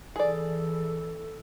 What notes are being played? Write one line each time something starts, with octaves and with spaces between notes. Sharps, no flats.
E3 G#4 A4 D5